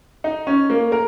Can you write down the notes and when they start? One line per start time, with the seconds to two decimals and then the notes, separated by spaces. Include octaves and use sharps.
0.24 D#4
0.47 C#4
0.70 A#3
0.92 A#4